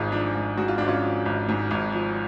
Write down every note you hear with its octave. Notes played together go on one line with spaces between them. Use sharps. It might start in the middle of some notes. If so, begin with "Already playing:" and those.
Already playing: G#1 G#2 F4 G#4
F3 D4
G#1
G#2 F#4
F4
G#1 D4
C#4 F4
F3
G#1
G#2
G#1
F3